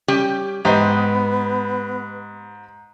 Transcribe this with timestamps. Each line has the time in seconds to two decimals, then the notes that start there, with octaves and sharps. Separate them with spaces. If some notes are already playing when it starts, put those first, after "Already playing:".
0.08 G3 C#4 G4
0.65 G#2 B3 G4 C5 D#5